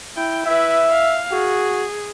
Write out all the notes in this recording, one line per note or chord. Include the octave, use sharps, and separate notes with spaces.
E4 G5
E4 B4 E5
F5
F#4 G#4